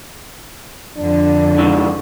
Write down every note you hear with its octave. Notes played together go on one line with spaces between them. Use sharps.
F2 D3 D4
G#2 C#3 E3